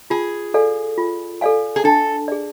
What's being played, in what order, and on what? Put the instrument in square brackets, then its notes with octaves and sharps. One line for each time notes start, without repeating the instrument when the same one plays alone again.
[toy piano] F4 [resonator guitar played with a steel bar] G#4
[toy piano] A4 D5 F5 G#5
F4
A4 D5 F5 G#5
[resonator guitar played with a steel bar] G#4
[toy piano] D4 [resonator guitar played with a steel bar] A4
[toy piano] G#4 D5